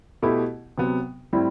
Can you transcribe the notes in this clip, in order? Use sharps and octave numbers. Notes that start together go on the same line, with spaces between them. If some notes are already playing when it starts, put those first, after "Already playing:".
B2 A3 E4 G4
C3 F#3 B3
A2 G3 C4 E4